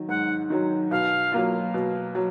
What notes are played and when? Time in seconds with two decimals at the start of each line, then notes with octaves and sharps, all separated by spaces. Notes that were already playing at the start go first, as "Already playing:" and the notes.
Already playing: D#3 F#3
0.09 G#2 F#5
0.50 D#3 F#3
0.91 B2 F5
1.32 F#3 A#3 F4
1.74 B2
2.15 F#3